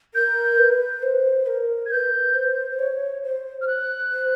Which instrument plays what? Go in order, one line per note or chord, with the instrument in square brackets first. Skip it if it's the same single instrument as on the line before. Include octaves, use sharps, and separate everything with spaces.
[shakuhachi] A#4 [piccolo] G6
[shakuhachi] B4
C5
A#4
[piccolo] G#6
[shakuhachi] B4 [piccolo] G6
[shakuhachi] C5
C#5
C5
[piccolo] F6
F#6
[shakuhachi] C5